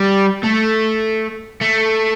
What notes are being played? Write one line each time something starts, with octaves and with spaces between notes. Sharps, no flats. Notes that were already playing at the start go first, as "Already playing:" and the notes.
Already playing: G3
A3
A3